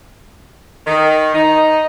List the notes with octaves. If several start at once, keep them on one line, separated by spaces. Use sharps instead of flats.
D#3
D#4